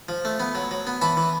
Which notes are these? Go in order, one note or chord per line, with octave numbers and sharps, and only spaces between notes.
F3
A3
B3
F#3
F#3
B3
E3 A5 B5
E3